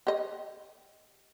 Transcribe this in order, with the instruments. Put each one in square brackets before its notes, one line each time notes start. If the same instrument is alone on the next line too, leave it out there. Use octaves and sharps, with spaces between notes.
[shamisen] G4 D#5